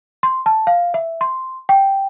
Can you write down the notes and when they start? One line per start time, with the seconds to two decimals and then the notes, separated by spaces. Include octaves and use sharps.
0.23 C6
0.46 A5
0.67 F5
0.94 E5
1.21 C6
1.69 G5